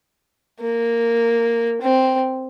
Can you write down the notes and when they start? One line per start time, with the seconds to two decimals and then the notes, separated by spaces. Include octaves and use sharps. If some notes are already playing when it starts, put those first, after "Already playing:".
0.60 A#3
1.82 C4